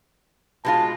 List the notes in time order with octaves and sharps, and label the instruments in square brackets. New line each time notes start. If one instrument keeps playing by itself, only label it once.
[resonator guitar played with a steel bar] B2 G#3 F4 [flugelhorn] A5